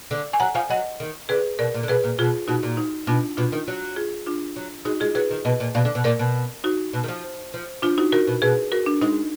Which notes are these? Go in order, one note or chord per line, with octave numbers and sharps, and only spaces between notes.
D3
G#5
F#3 F#5 A#5
F3 F5 G#5
F#3 D#5 F#5
D#3
D3 G#4 B4
B2 A#4 D5
A#2
D3
B2 G#4 B4
A#2
B2 F4 G#4
B2 D#4 F#4
A#2
D#4
B2 D4 F4
B2 D4 F4
D#3
F#3
F4 G#4
D4 F4
F#3
G#3 D#4 F#4
G#3 F4 G#4
F#3 G#4 B4
D#3
B2 B4 D#5
A#2
B2 D5 F5
D3
B2
A#2 A#4 D5
B2
D#4 F#4
B2
D#3
F3
F3
F3 D4 F4
D#4 F#4
D#3 F#4 A#4
B2
B2 G#4 B4
F#4 A#4
D4
G#3 D#4